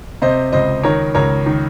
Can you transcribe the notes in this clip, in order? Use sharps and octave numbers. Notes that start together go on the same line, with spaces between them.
C3 C5 D#5
C#2 C5 D#5
D#3 A#4 C#5
C#2 A#4 C#5
D#3